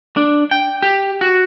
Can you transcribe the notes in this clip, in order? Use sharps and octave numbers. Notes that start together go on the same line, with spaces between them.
D4
G5
G4
F#4